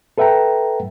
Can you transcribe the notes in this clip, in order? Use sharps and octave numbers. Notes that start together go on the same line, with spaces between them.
A4 B4 E5 F#5 G5 A#5